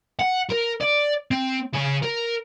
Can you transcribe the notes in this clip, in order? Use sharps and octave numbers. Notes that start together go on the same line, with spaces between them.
F#5
A#4
D5
C4
C#3 G#4
A#4